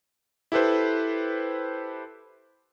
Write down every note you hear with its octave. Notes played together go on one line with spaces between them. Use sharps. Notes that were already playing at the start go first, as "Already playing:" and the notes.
E4 G4 A4 B4 C5